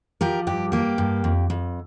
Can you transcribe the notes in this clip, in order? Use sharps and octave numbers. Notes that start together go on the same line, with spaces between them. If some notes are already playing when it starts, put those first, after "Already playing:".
F3 G4 A#4
G2 G4
A#3 G4
G2
F2
F2